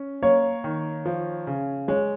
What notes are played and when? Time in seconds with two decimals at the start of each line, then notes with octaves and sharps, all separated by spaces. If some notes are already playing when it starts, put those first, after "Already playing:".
Already playing: C#4
0.22 A#3 C#5
0.64 D#3
1.06 F3
1.47 C#3
1.88 G#3 C#5